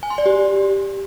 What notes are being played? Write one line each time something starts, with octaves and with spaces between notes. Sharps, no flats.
G#5
C6
D5
G4